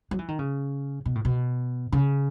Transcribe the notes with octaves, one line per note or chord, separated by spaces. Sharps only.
F#3
E3
D#3
C#3
B2
A2
B2
C#3